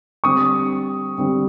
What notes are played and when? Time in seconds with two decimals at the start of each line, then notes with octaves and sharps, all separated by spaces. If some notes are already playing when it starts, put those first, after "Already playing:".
0.24 D3 G3 C4 C#6 D#6
1.18 D3 G3 C4